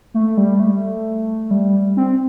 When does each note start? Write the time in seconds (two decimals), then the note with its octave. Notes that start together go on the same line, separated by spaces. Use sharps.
0.14 A3
0.37 G3
0.60 A3
1.51 G3
1.97 C4